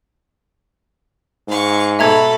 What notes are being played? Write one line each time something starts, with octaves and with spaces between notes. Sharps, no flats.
G#2 F5 C#6
B2 A4 E5 A#5 B5 G#6